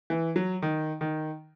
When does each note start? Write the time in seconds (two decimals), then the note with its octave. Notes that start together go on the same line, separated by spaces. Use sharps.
0.10 E3
0.36 F#3
0.62 D#3
1.01 D#3